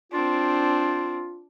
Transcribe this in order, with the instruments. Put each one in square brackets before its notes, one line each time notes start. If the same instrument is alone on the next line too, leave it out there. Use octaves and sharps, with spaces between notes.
[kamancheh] C4 D4 [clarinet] F4